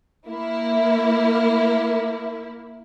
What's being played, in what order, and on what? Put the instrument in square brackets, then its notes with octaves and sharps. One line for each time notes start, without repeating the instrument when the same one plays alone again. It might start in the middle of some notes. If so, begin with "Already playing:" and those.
[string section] A#3 E4